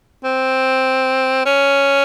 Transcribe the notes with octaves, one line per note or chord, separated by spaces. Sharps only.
C4
C#4